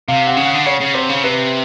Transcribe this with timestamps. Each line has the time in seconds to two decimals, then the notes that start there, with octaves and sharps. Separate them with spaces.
0.08 C3 F5
0.27 F#5
0.37 C#3
0.46 F#5
0.55 D3
0.66 C#3 C#5
0.81 C#3
0.95 C3 C5
1.09 C#3
1.23 C3 B4